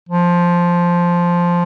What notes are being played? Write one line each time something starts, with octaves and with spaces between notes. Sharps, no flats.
F3